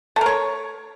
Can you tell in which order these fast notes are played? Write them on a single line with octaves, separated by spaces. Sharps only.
A3 A#4 C#5